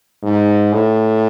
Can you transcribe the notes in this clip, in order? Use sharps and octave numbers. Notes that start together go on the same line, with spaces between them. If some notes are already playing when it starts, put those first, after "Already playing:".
G#2
A2